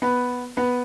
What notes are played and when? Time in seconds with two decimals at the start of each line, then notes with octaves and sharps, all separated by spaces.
0.02 B3 B4
0.57 B3 B4